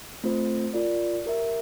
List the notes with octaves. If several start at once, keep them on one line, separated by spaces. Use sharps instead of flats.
A3 C4 F4 C5
F4 A#4 D5
G4 A#4 E5